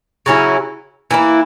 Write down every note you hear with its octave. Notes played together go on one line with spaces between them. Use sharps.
C#3 F#3 C#4 E4
E3 A#3 E4